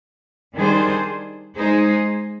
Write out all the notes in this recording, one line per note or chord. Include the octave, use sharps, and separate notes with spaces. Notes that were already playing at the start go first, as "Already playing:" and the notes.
D#3 G3 D4 G#4 C5
G#3 D#4 G#4 C5